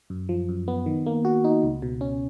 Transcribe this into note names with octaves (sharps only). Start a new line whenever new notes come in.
F#2
F3
F#2
B3
D#3
A#3
F#4
D#4
C#2
B2
C#4